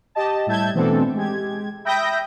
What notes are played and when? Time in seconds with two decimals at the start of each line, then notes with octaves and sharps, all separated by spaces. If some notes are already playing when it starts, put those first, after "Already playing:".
0.15 G4 D#5 A5
0.46 A2 G3 E5 A5 G6 G#6
0.74 B2 E3 A3 C4 D4 A4
1.14 G#3 G4 G#6
1.85 E5 G5 B5 D#6 G6 A#6